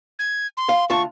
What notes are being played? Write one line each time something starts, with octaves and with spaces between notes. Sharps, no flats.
G#6
C6
F5
D2 F4 A5 C#6